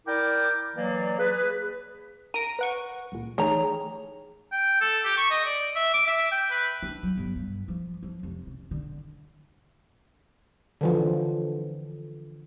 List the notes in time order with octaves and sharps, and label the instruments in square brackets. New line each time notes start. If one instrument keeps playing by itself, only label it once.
[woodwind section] E4 A#4 D5 G5 D6
E3 F#3 A#3 D5
G#4 B4
[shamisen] A#4 [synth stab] A#6 D7 D#7
[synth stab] B4 F#5 C#6
C#2 A#2
[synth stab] D#3 A3 [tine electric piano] E3 G#4 C#5 [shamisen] G3 A#5
[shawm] G5
A4
G4
C#6
D#5
D5
E5
D6
E5
G5
B4
[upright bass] D4
F#3
G1
G2
F3
F3
F1
C#3
D3
[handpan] D3 E3 F3